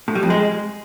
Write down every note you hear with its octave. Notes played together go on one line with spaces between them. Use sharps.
A2
G3
F2
G#3